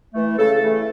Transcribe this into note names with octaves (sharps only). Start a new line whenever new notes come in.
E3 A3
C#3 A4
E3 A3